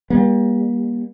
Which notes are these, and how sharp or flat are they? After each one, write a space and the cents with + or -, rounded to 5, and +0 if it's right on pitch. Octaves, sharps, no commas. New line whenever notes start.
G3 +25 A#3 +40